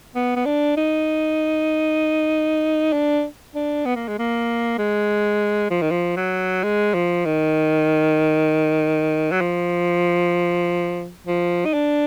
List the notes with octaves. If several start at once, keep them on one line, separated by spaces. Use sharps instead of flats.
B3
B3
D4
D#4
D4
D4
B3
A#3
G#3
A#3
G#3
F3
D#3
F3
F#3
G#3
F3
D#3
F#3
F3
F3
D#4
D4